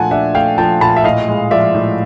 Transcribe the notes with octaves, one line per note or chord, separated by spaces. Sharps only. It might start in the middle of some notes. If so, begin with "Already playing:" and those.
Already playing: A#2 F3 A3 D4 F#5 G#5 A5
D4 E5 F#5
A3 F5 G5
F3 G5 A5
A#2 A5 B5
E5
A2 D#5 F5
G#3
F3 D5 E5
A2